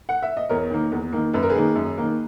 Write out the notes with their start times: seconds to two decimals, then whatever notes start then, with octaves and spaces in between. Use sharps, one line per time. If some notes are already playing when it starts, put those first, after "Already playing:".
0.09 F#5
0.22 E5
0.37 D#5
0.49 E2 A#4 C#5
0.70 D#3 A#3
0.92 E2
1.13 D#3 A#3
1.33 F#2 B4
1.43 A#4
1.50 G#4 B4
1.55 D#3 A#3
1.76 F#2
1.98 D#3 A#3